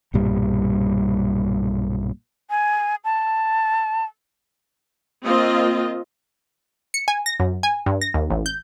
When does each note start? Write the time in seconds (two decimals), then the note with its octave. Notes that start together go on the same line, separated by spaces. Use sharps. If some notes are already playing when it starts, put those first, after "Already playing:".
0.14 B1 G2 A#2 G3
2.50 G#5
3.04 A5
5.24 A#3 C4 F4 D#5
6.94 C#7
7.08 G#5
7.26 A#6
7.40 F#2
7.63 G#5
7.86 G2
8.01 A#6
8.14 D#2
8.30 A1
8.46 G6